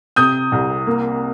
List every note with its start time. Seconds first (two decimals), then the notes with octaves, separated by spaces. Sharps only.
0.16 C3 D#6 G6
0.52 C2
0.87 A#3